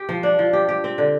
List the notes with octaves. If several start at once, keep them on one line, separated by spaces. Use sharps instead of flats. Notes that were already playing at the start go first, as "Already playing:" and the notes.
Already playing: G4
F3
D4
F3
G4
G4
C4
D3